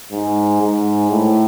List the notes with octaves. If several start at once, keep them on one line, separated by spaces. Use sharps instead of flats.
G#2
G#2
A2